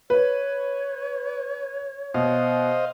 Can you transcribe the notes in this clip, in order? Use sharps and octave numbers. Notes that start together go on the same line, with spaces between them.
B4 C#5
B2 C5 D#5 F5